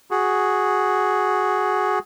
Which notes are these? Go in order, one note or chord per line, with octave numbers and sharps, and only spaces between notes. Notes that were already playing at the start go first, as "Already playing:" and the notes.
F#4 G#4